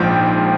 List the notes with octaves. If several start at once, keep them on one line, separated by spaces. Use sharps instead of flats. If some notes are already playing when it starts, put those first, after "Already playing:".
Already playing: A#1 G#2 F3 G5